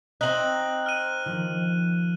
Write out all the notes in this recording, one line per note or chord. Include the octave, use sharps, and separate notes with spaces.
C4 D#4 F#6 F#7
F6 D#7
D#3 F3 A#3